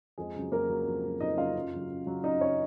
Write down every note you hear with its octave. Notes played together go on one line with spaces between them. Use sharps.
F2 G#3 G#4
C#3 F#3
F2 A#3 A#4
C#3 F#3
F2
C#3 F#3
F2 D#4 D#5
C#3 F#3 F4 F5
F#2
C#3 F#3
F#2
C#3 F#3
F#2 D#4 D#5
C#3 F#3 C#4 C#5